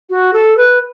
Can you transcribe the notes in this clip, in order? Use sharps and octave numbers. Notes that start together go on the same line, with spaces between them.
F#4
A4
B4